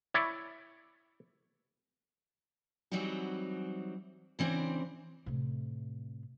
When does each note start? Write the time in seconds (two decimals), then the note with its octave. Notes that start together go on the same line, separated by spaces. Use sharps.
0.14 E4 C#5 D5
2.91 E3 F#3 G3 C4 D#4 F#4
4.39 C#3 E3 C4 D4 C5
5.26 A2 C3